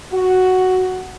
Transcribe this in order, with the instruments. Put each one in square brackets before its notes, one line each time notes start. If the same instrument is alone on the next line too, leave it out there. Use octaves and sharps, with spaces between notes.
[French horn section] F#4